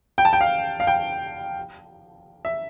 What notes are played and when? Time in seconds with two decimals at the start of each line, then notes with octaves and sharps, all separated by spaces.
0.18 G5
0.25 A5
0.33 G5
0.41 F5
0.80 F5
0.87 G5
2.45 E5